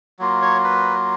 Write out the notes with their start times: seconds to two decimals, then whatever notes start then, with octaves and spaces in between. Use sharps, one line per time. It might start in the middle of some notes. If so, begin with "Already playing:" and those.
0.19 F#3 A#3 F4
0.42 C#5
0.64 B4